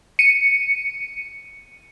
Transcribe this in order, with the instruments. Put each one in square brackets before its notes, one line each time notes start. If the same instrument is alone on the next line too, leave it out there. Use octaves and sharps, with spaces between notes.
[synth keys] C#7 D#7